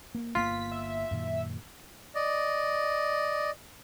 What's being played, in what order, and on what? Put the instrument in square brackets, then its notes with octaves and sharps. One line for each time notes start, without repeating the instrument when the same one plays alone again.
[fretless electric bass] A#3
[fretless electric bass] G1 A#3 B3 [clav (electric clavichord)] F4 [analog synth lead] B6
[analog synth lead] E5
[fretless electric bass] F#2 A#2 D#3
[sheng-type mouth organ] D5 D#5